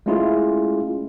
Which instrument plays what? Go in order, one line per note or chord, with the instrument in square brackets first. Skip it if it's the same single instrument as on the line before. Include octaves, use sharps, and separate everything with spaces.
[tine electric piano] G#3 A3 C#4 E4 F4 G#4